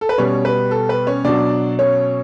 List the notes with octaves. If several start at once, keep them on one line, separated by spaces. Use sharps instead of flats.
A4
B4
B2 G3 C#4 C#5
B4
A4
B4
C#4 C#5
B2 F#3 D4 D5
C#4 C#5